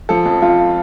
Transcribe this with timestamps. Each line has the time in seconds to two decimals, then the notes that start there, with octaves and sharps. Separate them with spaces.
0.09 F3 A4
0.26 F2
0.42 F3 F4